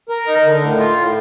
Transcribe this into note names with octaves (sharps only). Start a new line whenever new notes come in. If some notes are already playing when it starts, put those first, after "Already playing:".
A#4
D#4
D3
A2
F4
A2